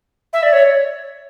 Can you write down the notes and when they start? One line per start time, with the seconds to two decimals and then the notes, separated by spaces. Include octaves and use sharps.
0.33 E5
0.43 D5
0.53 C#5